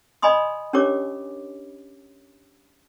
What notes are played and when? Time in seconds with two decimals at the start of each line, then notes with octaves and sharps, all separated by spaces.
0.22 D5 D#5 G#5 B5 C6 D#6
0.73 C#4 D4 G4 A#4 C#5 D6